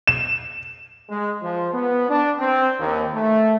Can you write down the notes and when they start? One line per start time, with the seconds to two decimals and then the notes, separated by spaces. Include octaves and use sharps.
0.07 E7
1.09 G#3
1.42 F3
1.73 B3
2.09 D4
2.39 C4
2.79 D#2
3.14 A3